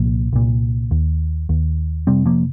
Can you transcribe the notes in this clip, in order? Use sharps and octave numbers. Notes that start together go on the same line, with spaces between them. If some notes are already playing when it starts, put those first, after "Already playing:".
Already playing: C2 A#2 F3 A#3
C2 A#2
D#2
D#2
F2 C3 G3 C4
F3 A#3